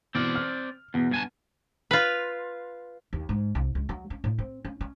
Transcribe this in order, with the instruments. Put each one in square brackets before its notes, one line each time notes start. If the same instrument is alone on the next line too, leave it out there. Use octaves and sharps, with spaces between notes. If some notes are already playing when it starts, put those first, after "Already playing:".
[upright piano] B2 E3 F6 [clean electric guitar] C4 D5
[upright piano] F6
[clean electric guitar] E2 [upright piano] B2 B3
[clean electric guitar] G2 G#5 A5 [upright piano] B3
[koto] F4 B4
[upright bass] D#2
G#2
C2
C#2
F#3
C#4
A2
C4
C#4
C#4